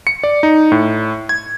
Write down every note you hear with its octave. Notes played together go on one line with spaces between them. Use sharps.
C#7
D5
D#4
A2
G#6